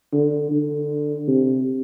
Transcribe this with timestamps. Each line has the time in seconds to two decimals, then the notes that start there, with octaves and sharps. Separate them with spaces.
0.13 D3
0.51 D3
1.28 C3